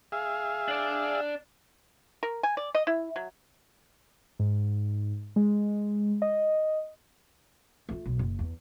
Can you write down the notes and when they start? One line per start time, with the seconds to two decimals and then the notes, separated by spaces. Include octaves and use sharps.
0.12 G#4 E5 F5
0.68 D4 D5
2.23 A#4
2.43 G#5
2.57 D5
2.75 D#5
2.87 E4
3.16 F#3
4.39 G#2
5.36 G#3
6.22 D#5
7.89 A3 F4
8.06 B1
8.19 F#1
8.39 E2